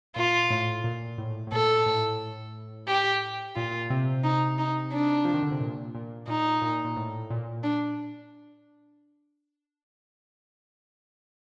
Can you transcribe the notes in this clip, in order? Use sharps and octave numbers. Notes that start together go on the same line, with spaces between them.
A#2 F4
A2
A#2
A2
A2
A#2 A4
A2
G4
A#2 F4
C3
D#4
D#4
D4
F3
D#3
D3
C3
A#2
A#2
A#2 D#4
A#2
A#2
A2
A#2
D4